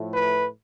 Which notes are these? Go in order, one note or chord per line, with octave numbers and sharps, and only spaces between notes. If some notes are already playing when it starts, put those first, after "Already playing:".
Already playing: A2 F3 A3
B4